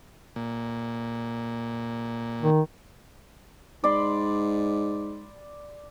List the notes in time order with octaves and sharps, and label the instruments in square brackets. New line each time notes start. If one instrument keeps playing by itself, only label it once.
[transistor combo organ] A#2
[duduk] D#3
[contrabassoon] G#2 [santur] D5 B5 C6